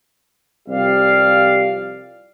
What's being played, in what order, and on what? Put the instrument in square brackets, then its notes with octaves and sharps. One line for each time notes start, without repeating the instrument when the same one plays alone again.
[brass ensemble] C2 F3 G3 D5 F5